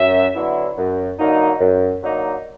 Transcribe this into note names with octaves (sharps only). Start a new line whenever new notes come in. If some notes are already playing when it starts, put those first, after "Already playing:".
Already playing: F#2 E5
D3 F#3 B3 E4
F#2
D3 F#3 A#3 D#4
F#2
D3 F#3 A#3 D#4